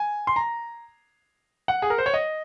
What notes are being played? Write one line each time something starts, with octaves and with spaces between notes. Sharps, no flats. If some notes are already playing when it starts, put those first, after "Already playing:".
Already playing: G#5
C6
A#5
F#5
G#4
A#4
C5
C#5
D#5